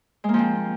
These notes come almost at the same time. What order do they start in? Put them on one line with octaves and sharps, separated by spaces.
G#3 A#3 F3 C4